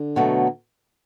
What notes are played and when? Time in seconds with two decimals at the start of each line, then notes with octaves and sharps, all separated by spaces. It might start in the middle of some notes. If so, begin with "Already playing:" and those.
Already playing: D3
0.16 B2 F#3 A3